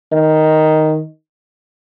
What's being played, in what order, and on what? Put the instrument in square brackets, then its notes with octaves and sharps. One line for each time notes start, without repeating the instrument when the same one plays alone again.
[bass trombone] D#3